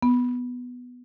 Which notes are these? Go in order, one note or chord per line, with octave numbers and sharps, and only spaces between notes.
B3